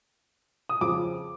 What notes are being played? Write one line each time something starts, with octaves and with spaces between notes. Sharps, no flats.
D#6
F2 C#3 F3 D6